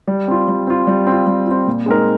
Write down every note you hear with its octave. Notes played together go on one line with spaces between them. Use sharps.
G3
C4 F4
G3
C4 F4
G3
C4 F4
G3
C4 F4
A#2
G#3 C4 D#4 A#4